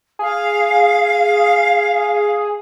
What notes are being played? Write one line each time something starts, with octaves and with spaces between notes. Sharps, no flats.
G#4 F5